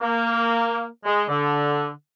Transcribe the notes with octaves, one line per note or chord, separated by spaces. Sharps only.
A#3
G#3
D3